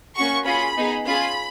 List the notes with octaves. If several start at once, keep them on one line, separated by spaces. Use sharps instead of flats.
A#3 C#4 F#4 C#6
C#4 F4 G#4 B5
B3 D#4 G#4
C#4 F4 G#4 B5